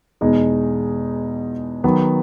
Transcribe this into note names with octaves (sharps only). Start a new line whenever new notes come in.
E2 B2 G#3 D#4
D#3 F#3 B3